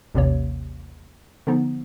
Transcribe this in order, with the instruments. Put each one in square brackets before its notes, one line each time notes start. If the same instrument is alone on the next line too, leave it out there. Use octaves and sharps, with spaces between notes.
[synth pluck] A1 D#2 C3 A#3 C#5
D3 F3 B3 D#4